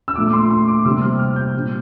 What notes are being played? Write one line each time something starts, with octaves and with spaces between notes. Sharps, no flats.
E6
A#2 A3 D4 D6
C6
C6
D6
C3 G3 A#3 D4 E6
F6
F6
G6
A#2 G3 D4